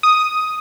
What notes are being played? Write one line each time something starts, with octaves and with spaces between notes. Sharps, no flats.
D#6